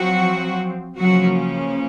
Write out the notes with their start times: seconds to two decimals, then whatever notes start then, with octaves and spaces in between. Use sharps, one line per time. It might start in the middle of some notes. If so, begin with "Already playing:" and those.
Already playing: F3 F#3 C4 F#4
0.99 C#3 F3 F#3 A#3 C#4 F#4